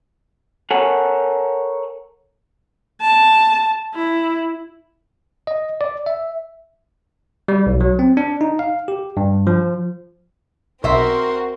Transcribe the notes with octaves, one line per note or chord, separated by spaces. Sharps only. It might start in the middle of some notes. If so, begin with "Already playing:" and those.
A4 A#4 C#5 F#5 G#5 A5
A5
E4
D#5
D5
E5
G3
B1
F#3
C4
D4
D#4
F5
G4
G2
F3
B1 C4 F#4 A#4 C5 E5 C6